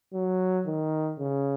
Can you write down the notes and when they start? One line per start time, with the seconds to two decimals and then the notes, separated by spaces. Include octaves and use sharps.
0.14 F#3
0.66 D#3
1.19 C#3